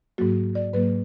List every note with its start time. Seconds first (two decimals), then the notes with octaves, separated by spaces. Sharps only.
0.18 G#2 F#3 A#3 F#4
0.55 D5
0.73 G#2 F#3 A#3 B4